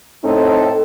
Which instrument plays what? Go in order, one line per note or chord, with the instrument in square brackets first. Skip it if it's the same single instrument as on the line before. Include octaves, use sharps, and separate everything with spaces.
[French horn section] A2 C4 D#4 A4